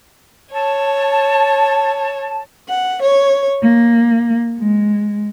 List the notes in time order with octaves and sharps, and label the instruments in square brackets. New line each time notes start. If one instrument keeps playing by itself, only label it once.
[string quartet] C#5 [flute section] A5
[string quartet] F#5
C#5
A#3
G#3